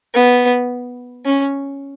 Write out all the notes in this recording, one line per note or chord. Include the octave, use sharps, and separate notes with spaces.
B3
C#4